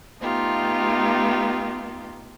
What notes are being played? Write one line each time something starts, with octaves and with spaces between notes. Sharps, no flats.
A3 B3 D#4 F4 G4